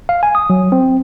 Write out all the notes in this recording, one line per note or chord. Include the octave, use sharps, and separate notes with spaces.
F5
G#5
D#6
F#3
C4